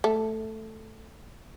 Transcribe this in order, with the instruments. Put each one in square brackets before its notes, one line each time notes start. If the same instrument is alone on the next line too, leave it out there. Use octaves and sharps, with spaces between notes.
[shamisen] A3